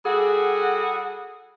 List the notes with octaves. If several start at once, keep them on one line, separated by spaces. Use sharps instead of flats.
G3 F#4 G#4 A4